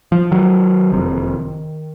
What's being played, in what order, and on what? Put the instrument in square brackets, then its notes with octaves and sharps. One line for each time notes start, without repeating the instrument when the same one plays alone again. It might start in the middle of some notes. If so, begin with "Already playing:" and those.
[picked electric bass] F3
D#3 F#3
F#1 F2 C3